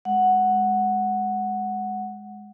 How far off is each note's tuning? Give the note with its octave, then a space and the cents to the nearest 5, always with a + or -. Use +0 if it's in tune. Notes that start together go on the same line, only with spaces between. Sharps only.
G#3 +0 F#5 +0